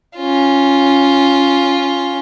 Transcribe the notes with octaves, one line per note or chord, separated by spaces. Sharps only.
C#4 F4